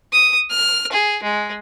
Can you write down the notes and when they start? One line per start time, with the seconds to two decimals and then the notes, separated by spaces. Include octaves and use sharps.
0.13 D#6
0.50 F6
0.92 G#4
1.23 G#3